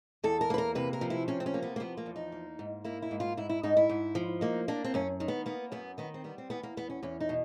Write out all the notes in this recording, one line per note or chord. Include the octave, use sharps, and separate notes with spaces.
E2 A4
A#4
A#3 B4
A#4
C3 B4
A#4
F3
E4
C3 C#4
C4
C#4
A#3
B3
A#3
F3 B3
A#3
E2
D#4
A#3
G#2
A#3 E4
E4
G#2
F4
G#2 E4
E4
G#2 D#4
E4
G#2
F3
A#3 D#4
A#3 D4
C4
F#2 C#4
D#3
B3
A#3 B3
F#2 B3
D#3 B3
C4
G3 B3
C4
E2 B3
A#3
E2 B3
C#4
E2 C#4
D#4
B2